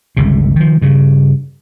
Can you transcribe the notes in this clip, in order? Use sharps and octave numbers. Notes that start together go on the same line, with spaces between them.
G1 C#2 C3
D#3 F3
G2 C#3